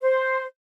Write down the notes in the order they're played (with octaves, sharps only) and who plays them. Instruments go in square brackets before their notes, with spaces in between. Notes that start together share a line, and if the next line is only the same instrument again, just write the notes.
[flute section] C5